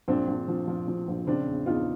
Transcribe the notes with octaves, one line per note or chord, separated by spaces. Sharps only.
A#1 C4 D4
A#1
F3
F3
F3
A#1
C#3 C4 D4
E2
E2 D#4 F4